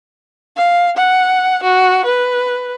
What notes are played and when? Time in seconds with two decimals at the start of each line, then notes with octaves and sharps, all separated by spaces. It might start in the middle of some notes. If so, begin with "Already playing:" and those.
0.57 F5
0.97 F#5
1.63 F#4
2.05 B4